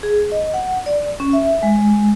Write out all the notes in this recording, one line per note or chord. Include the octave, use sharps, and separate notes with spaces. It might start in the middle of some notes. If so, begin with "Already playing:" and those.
G#4
D#5
F#5
D5
C#4
E5
G#3